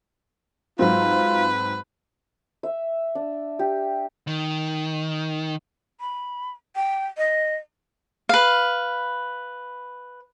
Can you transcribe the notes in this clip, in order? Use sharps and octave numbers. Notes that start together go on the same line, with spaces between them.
G#2 F#3 C4 F4 B4
E5
D4
G4
D#3
B5
G5
D#5
B4 F5